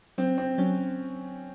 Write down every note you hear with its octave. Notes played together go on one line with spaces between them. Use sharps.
F#3 C4
C4
F#3 C#4